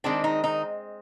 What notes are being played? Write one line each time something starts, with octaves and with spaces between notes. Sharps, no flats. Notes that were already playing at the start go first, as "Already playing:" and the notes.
D#3 G#3 C4 D4
D#4
D#4